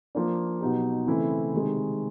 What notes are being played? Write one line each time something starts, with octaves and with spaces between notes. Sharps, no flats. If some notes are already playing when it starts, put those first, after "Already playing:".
F3 A#3 D4
B2 F#3 B3 D#4 G4
C#3 E3 A3 C4 E4
C3 D#3 G#3